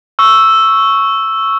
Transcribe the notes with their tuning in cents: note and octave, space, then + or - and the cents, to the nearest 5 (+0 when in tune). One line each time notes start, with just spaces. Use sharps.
C#6 +0 E6 +0